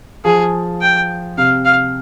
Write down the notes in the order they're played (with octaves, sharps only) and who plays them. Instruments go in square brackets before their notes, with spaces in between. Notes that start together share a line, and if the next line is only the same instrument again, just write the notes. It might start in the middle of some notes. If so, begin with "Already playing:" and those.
[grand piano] F3 [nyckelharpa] G#4
[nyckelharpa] G5
[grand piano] C3 [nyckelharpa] F5
[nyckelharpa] F5